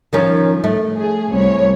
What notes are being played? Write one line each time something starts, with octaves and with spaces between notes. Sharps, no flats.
D#3 F3 C#4
A3
G#4
C2 C#5